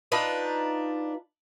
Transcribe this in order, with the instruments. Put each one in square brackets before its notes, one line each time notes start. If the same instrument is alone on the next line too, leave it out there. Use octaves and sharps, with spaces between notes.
[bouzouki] D4 D#4 F4 B4